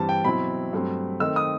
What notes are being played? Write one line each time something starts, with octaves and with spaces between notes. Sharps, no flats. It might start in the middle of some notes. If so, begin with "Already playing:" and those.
Already playing: G2 E3 G3 C4 A5
G5
B2 F#3 C4 E4 B5
G2 F#3 A3 C4
D#3 A3 C4 D#4 E6
D#6